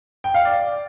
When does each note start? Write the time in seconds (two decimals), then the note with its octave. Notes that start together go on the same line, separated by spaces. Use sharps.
0.24 G5
0.34 F5
0.45 D5